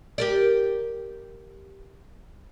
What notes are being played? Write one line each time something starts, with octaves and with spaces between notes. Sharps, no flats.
G4 A#4 D5